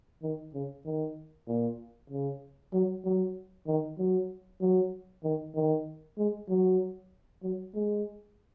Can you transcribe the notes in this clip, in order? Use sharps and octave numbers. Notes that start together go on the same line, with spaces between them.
D#3
C#3
D#3
A#2
C#3
F#3
F#3
D#3
F#3
F#3
D#3
D#3
G#3
F#3
F#3
G#3